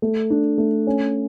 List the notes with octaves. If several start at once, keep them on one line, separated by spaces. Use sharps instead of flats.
A3
D4
A3
C#4